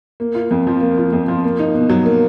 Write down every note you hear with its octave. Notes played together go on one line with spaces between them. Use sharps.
A#3
F4
F2
F3
A#3
F4
F2
F3
A#3
D#4
B2
F#3
A#3